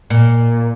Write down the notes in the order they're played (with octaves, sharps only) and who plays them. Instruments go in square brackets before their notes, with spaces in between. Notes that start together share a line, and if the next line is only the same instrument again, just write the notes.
[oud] A#2